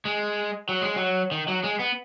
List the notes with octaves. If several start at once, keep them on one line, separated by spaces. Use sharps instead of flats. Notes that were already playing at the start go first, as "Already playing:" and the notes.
G#3
F#3
G#3
F#3
D#3
F#3
G#3
B3